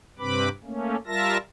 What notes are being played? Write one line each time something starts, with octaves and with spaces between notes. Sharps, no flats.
G2 C3 C4 B4 B5 D6
A3 A#3 C#4
G3 F4 A#4 E5 A5 A#6